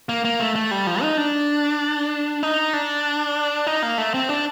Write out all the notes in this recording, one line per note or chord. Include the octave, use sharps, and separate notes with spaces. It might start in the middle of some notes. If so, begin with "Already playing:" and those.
A#3
A#3
A3
A3
G3
F3
D#4
D4
D#4
D4
D#4
A#3
A3
C4
D4